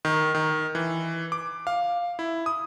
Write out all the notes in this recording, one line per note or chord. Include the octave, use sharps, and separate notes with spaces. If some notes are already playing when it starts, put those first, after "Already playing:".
D#3
D#3
E3
D6
F5
E4
D#6